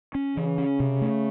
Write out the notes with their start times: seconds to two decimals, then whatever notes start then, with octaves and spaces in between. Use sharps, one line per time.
0.15 C#4
0.36 C#3 E3
0.58 C#4
0.80 C3
1.01 A3